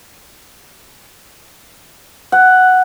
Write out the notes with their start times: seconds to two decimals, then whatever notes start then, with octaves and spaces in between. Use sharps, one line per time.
2.32 F#5